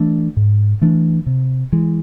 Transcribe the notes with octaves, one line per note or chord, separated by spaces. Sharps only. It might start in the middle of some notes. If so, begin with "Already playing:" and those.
Already playing: E3 A3 D4
G#2
E3 A3 D4
C3
E3 G#3